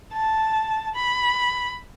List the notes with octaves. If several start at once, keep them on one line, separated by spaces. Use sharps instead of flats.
A5
B5